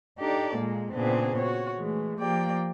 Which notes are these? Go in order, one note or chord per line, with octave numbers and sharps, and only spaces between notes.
D4 D#4 G4 A4 D5
A#2 G#3 A#3
A#2 C#3 B3 C4 D4 G#4
F#4 C#5
E3 G#3 A3
F3 A#3 G4 D5 G5